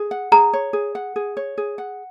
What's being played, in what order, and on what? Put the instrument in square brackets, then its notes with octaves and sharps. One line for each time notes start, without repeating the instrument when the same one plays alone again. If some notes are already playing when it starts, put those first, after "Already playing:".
Already playing: [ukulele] G#4
F#5
[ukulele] G#4 [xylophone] A#5
[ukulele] C#5
G#4
F#5
G#4
C#5
G#4
F#5